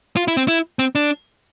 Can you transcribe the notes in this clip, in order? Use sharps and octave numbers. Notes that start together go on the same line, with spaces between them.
F4
E4
C4
E4
C4
D4